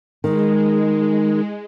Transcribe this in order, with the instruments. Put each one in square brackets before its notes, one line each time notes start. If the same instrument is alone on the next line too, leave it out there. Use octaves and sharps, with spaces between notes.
[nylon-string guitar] D#3 [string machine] G#3